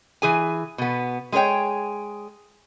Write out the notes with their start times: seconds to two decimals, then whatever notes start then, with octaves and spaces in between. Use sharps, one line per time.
0.22 E3 G#4 G#5
0.78 B2 B3
1.32 G#3 G#4 B4 C#5 G5